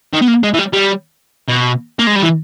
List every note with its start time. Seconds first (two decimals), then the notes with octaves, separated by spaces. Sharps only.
0.13 D#3
0.22 B3
0.28 A#3
0.43 G#3
0.54 E3
0.59 G3
0.73 G3
1.48 B2
1.99 A#3
2.07 G#3
2.15 G3
2.23 E3